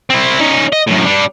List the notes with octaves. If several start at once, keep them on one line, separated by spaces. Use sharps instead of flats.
C4 E4
C#4 D#4
D#5
F#2 A2
G3 D4